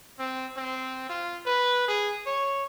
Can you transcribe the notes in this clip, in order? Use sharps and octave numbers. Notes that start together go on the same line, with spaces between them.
C4
C4
F4
B4
G#4
C#5